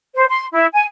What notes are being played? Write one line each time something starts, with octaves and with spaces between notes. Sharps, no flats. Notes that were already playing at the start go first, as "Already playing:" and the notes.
C5
C6
E4
G#5